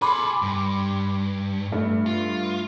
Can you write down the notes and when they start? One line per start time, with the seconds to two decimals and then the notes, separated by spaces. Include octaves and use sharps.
0.02 G#4 A4 B5 C6 D6
0.42 G2
1.72 G2 A3
2.06 F4